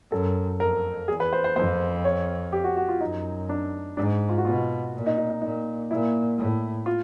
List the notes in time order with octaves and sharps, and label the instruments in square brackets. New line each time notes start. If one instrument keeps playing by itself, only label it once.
[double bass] F#2 [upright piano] A4
[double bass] F2 [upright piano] A#4
[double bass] E2 [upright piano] G#4
[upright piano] B4
C5
C5
[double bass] F2 [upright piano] C5
[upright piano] C#5
G4
F#4
F#4
F4
[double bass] F#2 [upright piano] D#4
[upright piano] D4
[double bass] G#2 [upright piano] D4
[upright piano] F4
F#4
[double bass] B2 [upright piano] F4
[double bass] A#2
[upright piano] D#4
D#4
D#4
[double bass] A#2 [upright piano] D#4
[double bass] A#2 [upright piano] E4
[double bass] A2
[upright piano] F4